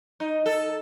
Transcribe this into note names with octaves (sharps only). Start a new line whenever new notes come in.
D#4
A4